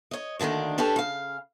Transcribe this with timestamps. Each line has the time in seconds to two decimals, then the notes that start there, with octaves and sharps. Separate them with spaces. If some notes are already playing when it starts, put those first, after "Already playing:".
0.11 C#5 D#5
0.39 D2 D3 D#3 A#3 D4
0.78 C#4 D4 G4 A4 B4 C#5
0.96 C#3 F5